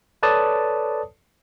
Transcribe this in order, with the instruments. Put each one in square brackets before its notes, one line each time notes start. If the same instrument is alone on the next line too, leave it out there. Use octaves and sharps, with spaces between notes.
[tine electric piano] A4 B4 C#5 D5 A5 D#6